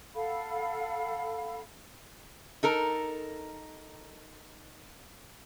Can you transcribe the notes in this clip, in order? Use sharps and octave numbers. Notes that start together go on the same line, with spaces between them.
A4 F5 F#5 B5
D#4 A4 A#4